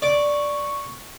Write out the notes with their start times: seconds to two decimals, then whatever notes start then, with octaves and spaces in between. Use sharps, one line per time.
0.02 D5 C#6